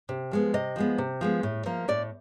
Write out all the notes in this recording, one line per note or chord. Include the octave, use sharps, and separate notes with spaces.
C3
F3 G#3 B3
C3 D#5
F3 G#3 B3
C3
F3 G#3 B3
A2
F3 A#3
A2 D5